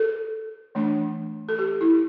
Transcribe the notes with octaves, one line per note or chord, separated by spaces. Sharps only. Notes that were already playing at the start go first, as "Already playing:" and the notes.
Already playing: A4
E3 A3 D4
A4
G4
E4